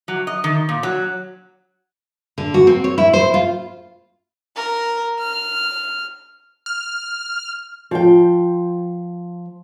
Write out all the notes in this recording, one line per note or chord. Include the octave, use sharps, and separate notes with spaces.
F#3
D#5
D#3
A#2
F#3
D3
F#4
C4
C#5
E4
C5
F4
A#4
F6
F6
F3 G5